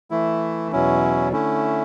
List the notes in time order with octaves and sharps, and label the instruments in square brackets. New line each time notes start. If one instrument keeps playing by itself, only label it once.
[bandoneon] E3 A3 E4
E2 B2 F#3 C#4 E4
D3 A3 C#4 E4